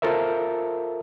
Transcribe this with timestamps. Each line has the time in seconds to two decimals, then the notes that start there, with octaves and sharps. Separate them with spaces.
0.02 F4 A4 A#4 C5 E5